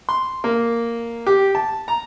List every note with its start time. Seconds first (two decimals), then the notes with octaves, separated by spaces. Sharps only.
0.09 C6
0.44 A#3
1.27 G4
1.55 A5
1.88 A#5